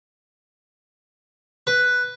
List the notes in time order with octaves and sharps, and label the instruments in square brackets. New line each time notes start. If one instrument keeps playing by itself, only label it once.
[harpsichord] B4